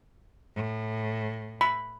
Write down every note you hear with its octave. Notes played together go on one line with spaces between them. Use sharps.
A2
B5